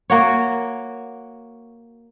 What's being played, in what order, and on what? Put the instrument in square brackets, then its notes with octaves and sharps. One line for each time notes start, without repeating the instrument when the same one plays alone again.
[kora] A#3 F#4 C#5